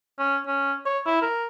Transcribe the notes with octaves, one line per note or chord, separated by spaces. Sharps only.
C#4
C#4
C#5
E4
A#4